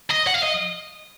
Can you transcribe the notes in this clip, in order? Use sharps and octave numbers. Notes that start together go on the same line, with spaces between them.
D#5
F#5
F5
D#5